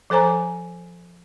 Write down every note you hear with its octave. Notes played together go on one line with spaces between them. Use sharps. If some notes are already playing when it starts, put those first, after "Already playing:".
F3 A4 C5 G#5 A#5